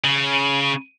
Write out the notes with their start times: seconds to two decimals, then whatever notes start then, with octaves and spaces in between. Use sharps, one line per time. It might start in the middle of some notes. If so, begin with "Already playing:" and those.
0.04 C#3